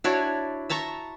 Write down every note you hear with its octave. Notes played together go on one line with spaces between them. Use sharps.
D4 E4 F#4 C#5
E5 A5 A#5 C#6